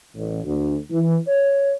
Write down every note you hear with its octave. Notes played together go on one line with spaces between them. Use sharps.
A1
D2
E3
C#5